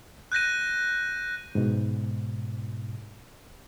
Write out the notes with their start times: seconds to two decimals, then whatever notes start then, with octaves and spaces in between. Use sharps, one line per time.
0.32 F#6 G6 A#6 D#7
1.55 G#2 B2